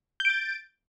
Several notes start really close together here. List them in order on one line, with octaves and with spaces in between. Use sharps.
G6 D7 A6